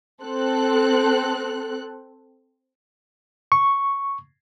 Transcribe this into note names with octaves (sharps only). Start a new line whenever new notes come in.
C4 A4 F#6
C#6